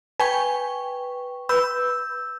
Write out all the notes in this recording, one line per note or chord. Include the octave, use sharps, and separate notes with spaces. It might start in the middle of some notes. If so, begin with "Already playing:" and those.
B4 G5 G#5 C#6
B4 E6 G6